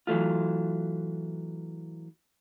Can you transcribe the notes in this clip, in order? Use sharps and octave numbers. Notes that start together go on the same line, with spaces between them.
E3 F#3 A3 F4